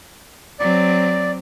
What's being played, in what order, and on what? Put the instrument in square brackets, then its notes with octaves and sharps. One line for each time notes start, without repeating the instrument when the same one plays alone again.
[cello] F#3 C4 [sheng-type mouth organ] D5